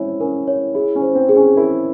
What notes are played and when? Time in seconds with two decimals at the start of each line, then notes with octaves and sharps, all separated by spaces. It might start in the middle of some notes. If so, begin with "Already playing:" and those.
Already playing: G#3 C4 C#4 E4 C#5
0.20 C#4 A#4
0.47 E4 C#5
0.74 E4 G#4
0.95 C#4
1.02 C5
1.15 C4
1.29 G#4
1.36 C#4
1.57 E4 A#4